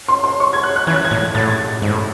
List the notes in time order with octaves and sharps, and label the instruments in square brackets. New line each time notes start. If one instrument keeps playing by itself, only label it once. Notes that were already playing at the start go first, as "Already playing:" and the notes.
[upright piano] C6
C6
C#6
G#6
F#6
F#6
[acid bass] E3 [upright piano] G#6
[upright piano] F#6
G#6
[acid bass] A2
[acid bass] A2 [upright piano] A6
[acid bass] G#2
A2